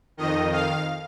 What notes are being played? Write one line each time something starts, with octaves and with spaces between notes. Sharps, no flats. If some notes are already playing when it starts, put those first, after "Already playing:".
F2 D#3 D#5
F5